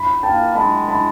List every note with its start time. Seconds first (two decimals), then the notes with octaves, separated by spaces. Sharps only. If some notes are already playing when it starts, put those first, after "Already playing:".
Already playing: B5
0.23 A#3 G5 A5
0.55 G#3 A5 B5
0.88 A5 B5